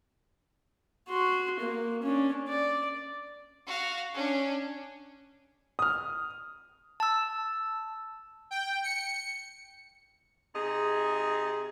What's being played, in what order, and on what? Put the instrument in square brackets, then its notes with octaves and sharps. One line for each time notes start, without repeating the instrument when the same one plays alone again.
[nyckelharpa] F#4 C6
A#3
C#4 D4
D5
[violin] F#4 F5
C#4 D4
[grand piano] D#6 F6
[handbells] A5 E6
[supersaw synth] G5
C#7
[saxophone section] C3 D#4 G#4